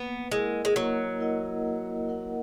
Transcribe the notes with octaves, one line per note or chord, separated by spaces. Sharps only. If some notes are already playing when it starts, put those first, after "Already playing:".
Already playing: A#3 B3
G#3 E4 A#4 D#5 F#5
G#3
F#3 A#3
E4 A#4 D#5 F#5
A#3
E4 A#4 D#5 F#5